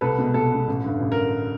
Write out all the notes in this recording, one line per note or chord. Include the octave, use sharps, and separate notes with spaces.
C2 A4 B4
B2 G#3
C2 A4
B2 G#3
A1
G2 D3
A1
A#4